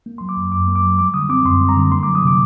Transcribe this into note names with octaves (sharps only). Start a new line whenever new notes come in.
A#3
F#3 C6
D6
F#2
F#2 D6
A#3
D6
F#3
G3 D6
D3 D#6
C4 D6
F#2 C6
G3
A#5
D3
A#3 C6
D6
F#3
D#6
C3 D6